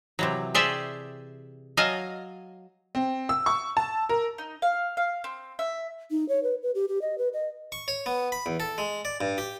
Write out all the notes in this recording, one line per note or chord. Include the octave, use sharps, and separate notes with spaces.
C3 E3 F#3
G4 G#4 C5 D5 E5
F#3 D#5 F5 G#5 A5
C4
E6
C#6
A5
A#4
D#4
F5
F5
C4
E5
D#4
C#5
B4
B4
G4
G4
D#5
B4
D#5
C#6
C#5
B3
B5
E2
A4
G#3
D5
G2
G4